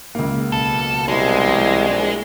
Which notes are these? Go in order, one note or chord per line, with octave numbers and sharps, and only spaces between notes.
C#2 A#3
B1 A4
C2 G#3
E3
A#1 D5